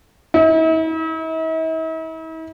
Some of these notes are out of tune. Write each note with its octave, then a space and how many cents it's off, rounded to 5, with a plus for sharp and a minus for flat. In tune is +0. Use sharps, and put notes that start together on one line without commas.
E4 -45